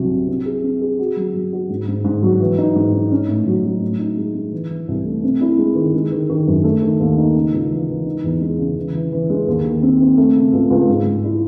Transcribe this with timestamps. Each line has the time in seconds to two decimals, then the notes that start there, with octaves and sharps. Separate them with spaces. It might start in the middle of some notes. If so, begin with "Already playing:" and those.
Already playing: C2 C3 F#3
0.10 C3
0.28 C4
0.45 G#4
0.63 C4
0.81 G#4
0.99 F#4
1.17 F#3
1.34 F#3
1.53 F#4
1.69 G#2
1.88 G#2
2.05 G#2
2.23 F#3
2.40 E3
2.58 D#4
2.75 G#2
2.93 D#4
3.11 C#4
3.28 A2
3.47 F#3
3.65 F#3
3.81 A2
3.99 D#4
4.17 G#3
4.34 G#3
4.53 E3
4.70 E3
4.88 C2
5.05 A3
5.23 C4
5.41 E4
5.58 G#3
5.75 D#3
5.94 G#3
6.12 D#3
6.30 D#3
6.47 F#2
6.64 A3
6.82 D#3
7.00 D#2
7.18 D#4
7.35 C#3
7.53 C#2
7.70 E3
7.88 E3
8.06 D#4
8.23 E2
8.41 G#3
8.58 C#3
8.77 E3
8.95 E3
9.12 E3
9.30 G#3
9.47 D#2
9.65 D#3
9.82 C4
10.01 C4
10.17 A3
10.36 C#3
10.53 C#2
10.70 C#2
10.88 G#2
11.06 G#2
11.24 E4